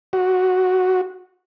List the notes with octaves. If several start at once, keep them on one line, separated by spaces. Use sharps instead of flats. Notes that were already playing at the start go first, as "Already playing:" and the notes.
F#4